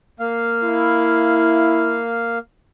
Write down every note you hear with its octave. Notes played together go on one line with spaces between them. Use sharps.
A#3 F5
E4